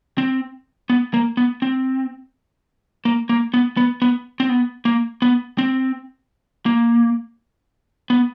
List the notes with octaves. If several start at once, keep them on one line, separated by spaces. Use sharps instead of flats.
C4
B3
A#3
B3
C4
A#3
A#3
B3
B3
B3
C4
B3
A#3
B3
C4
A#3
B3